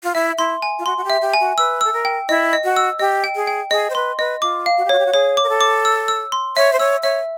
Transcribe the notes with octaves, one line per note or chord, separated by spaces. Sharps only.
F4
E4 E5
E4 C6
G#5
F4
F#4 C6
F#4
G4
E5
G4
G#5
F#4
B4 E6
A4 E6
A#4
G5
E4 D#5
D#5
F#4
E6
G4 D#5
G5
G#4
G5
G#4 D#5
C5
B4 C6
B4 D#5
F4 D6
F5
F#4
G4
F#4 C#5
G4
F#4
G#4 C#5
D6
A#4
A4
D6
E6
E6
C6
C#5 E5
C5
C#5 E6
C#5 E5